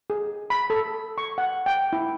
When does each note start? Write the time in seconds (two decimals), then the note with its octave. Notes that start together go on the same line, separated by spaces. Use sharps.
0.10 G#4
0.50 B5
0.70 A4
1.18 C#6
1.38 F#5
1.66 G5
1.93 E4